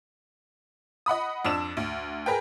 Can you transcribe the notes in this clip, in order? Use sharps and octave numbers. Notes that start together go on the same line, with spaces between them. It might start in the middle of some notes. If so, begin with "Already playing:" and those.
D#5 F#5 B5 D#6
F2 D4 E6 E7
D2
G#4 A#4 B4 G5